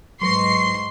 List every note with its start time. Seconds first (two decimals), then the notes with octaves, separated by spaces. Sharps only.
0.22 G#2 F#3 B4 C6 C#6 A#6 C7